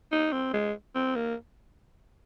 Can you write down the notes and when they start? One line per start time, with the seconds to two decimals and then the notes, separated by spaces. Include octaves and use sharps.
0.12 D#4
0.32 C4
0.53 G#3
0.95 C4
1.15 A#3